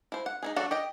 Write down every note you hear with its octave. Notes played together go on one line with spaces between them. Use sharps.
E4 C5
F#5
D#4 E4 G#4
F#3 D4 F#4 A4
G4 D#5 G5